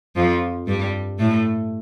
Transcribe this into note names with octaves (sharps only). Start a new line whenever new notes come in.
F2 F3
G2 G3
A2 A3